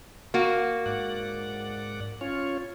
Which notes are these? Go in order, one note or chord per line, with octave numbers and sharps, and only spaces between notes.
A#3 F#4
G#2 D5 F#5
C#4 F4 C#5